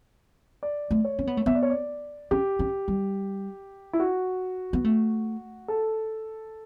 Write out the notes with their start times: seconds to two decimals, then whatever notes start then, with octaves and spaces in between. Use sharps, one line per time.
0.63 D5
0.91 A3
1.05 C#5
1.19 C#4
1.27 B3
1.37 A3
1.46 B3 E5
1.55 D5
1.63 C#5
1.70 D5
2.31 C#4 G4
2.59 C#4
2.88 G3
3.93 E4
4.00 F#4
4.73 B3
4.84 A3
5.68 A4